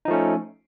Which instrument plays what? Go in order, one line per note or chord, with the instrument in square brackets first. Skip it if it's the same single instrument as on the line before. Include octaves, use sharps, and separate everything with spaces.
[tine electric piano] D#4
F3
A3
C#4